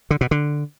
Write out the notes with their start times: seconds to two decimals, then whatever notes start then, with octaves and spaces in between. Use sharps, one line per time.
0.11 D3
0.21 B2
0.31 D3